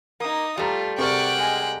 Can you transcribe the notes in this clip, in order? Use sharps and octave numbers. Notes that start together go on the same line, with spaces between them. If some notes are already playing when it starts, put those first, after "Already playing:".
A#3 D#4 D#6
G3 A3 F4 G4 A5 A#5
C3 G#4 A#4 D5 F#5 G5 C#6
G#3 G#5